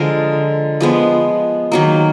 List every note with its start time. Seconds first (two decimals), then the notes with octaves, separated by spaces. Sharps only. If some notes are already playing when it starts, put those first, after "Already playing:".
Already playing: D3 F3 G#3 A#4
0.81 F3 G#3 B3
1.72 D#3 F#3 A#3